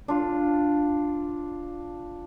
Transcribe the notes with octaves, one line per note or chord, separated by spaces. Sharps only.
D4 F4